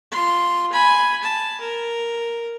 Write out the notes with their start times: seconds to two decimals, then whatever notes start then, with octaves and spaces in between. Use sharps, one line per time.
0.11 F4 C6
0.72 G#5 B5
1.23 A5
1.60 A#4